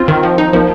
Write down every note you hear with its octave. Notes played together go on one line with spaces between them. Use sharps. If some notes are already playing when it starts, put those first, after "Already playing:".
Already playing: C4 F4
D#3
F3
D#4
F3 A#3